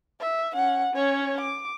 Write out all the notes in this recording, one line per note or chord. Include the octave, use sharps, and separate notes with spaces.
E5
C#4 F#5
C#4 C#5
D6